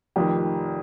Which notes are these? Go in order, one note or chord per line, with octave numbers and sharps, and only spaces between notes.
F1 F2 D#3 G4